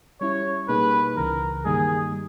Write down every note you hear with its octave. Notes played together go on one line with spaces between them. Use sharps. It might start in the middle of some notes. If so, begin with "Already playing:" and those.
G3 C#4 E4 C#5
B2 G3 A#3 D#4 G#4 B4
C#2 C#3 E3 A#4
G2 D#3 G3 A#3 D#4 G#4
G3